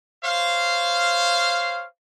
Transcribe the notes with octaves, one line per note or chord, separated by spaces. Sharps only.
C5 C#5 F5